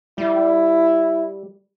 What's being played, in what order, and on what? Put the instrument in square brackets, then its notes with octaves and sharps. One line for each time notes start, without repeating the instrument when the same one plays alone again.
[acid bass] G3 [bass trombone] E4